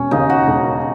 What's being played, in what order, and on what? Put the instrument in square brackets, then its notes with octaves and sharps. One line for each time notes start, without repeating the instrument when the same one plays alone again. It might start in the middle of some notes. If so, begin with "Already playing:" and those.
Already playing: [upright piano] E1 [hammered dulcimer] C#4
[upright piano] D#2 C#3 [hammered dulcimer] D#4
[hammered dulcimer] F#4
[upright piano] E1